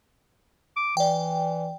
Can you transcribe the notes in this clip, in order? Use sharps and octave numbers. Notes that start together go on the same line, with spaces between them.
D6
E3 D5 G5